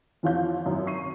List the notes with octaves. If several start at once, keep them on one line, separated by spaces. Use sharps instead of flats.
F2 E3 F4 C#5 G6
G#1 F#2
C#6 C7 D#7